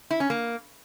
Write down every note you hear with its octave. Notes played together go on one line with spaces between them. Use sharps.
E4
C#4
A#3